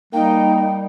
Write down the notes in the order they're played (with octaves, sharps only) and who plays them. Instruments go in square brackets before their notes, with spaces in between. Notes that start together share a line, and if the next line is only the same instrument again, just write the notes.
[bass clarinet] G3 [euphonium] A#3 [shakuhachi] D#4 [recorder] G5